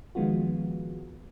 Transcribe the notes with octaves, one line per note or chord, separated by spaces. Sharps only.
D#3 F3 G#3 B3 F4 F#4